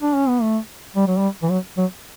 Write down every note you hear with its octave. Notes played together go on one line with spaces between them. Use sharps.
D4
C#4
B3
A3
G3
F#3
G3
E3
F#3
F#3